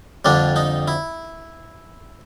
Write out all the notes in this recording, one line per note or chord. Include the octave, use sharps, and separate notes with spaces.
F2 D3 G3 D4
D#4
E4